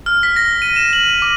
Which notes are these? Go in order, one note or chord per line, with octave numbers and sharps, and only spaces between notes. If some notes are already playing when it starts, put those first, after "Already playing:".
F6
B6
A#6
D#7
E7
F#7
D6